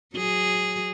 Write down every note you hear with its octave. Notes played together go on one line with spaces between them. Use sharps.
F#3 G#4